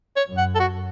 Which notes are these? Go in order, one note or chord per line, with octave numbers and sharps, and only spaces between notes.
C#5
F#2
F#5
A4
F#4